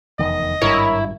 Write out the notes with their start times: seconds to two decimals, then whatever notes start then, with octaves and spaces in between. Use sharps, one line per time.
0.19 F1 E2 D#3 D#5
0.61 G#1 G2 E4 A#4 C#5